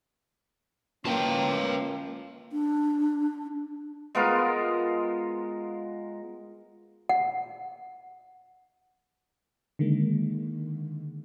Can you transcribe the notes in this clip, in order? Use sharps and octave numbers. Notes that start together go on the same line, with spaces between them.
A#3 C#4 F4 B4 F5 G5 A5
D4
G#3 B3 F4 A#4
F#5
D3 D#3 G#3 A#3